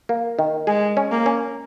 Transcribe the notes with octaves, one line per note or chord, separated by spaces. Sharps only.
A#3
D#3
G#3 G#4
C#4
A#3
C#4